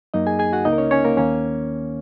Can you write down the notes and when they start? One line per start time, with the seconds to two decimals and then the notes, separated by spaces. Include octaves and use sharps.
0.14 F#2 F#3 A#3 D#4 D#5
0.27 G#4 G#5
0.39 G#4 G#5
0.53 F#4 F#5
0.65 C#2 C#3 A#3 D#4 D#5
0.73 A#4
0.78 C#4 C#5
0.91 C#4 C#5
1.05 A#3 A#4
1.17 D#2 D#3 A#3 C#4 C#5